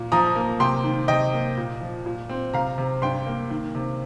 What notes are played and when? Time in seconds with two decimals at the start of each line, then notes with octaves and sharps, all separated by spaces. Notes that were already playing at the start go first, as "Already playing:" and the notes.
Already playing: A#2
0.12 F3 A#5 D#6
0.36 A#3
0.60 C3 G5 C6
0.84 D#3
1.08 C3 D#5 G5
1.33 A#3
1.57 A#2
1.81 F3
2.06 A#2
2.29 C4
2.53 C3 F5 A#5
2.78 C3
3.02 G2 G5 C6
3.26 A#3
3.50 D#3
3.75 C3